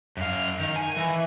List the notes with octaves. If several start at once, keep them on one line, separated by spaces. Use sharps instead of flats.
F#2 F5
D#3
G#5
E3